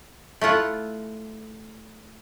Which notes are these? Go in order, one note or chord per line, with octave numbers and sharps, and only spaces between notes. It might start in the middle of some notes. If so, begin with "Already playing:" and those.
A3 E4 F4 F#5